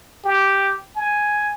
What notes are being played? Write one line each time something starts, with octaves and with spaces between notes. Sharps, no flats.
G4
G#5